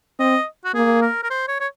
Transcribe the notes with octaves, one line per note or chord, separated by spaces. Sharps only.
C4 D#5
F#4
A#3 G#4
A#4
A#4
C5
C#5
C#5